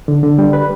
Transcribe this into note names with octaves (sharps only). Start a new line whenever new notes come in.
D3
D3
G3
B4